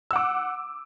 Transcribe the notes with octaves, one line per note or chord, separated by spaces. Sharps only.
F#5 D6 E6